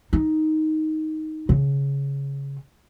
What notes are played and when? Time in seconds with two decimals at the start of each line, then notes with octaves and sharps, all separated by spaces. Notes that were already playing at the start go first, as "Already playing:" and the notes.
0.13 D#4
1.49 C#3